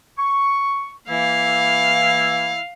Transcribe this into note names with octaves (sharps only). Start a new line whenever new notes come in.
C#6
E3 A#3 E4 F5